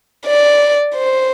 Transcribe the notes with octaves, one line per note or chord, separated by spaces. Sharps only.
D5
C5